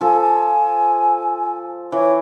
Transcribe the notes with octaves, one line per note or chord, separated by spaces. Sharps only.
F3 A4 G#5
G#5
E3 C#5